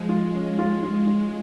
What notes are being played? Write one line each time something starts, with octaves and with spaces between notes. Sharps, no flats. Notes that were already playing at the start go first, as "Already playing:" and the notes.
Already playing: F3 G#3
F4
C#4
F4
F4
F4